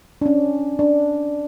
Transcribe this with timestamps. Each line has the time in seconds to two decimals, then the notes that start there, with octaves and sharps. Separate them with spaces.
0.22 D4
0.26 C#4
0.79 D4